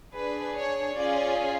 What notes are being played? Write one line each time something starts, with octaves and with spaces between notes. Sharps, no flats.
D4 G#4 B4
C#5
C#4 F4 G#4 D5